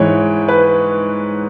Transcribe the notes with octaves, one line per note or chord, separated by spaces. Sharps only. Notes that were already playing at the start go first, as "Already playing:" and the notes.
Already playing: G#2 E3 C#5
B4